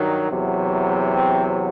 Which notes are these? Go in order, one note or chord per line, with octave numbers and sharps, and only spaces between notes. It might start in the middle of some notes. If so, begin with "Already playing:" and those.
Already playing: G2 D#3 F#3
E2 C3 F#3
C4